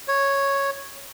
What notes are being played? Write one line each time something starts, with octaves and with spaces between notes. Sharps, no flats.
C#5